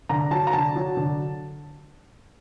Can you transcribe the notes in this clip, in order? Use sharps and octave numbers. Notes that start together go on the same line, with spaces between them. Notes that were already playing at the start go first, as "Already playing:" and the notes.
D3 A#5
F#3 A5
A#5
D3 A5
F#3
D3